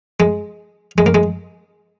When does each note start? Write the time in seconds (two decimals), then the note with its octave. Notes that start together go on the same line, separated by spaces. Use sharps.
0.20 G#3
0.98 G#3
1.06 A#3
1.15 G#3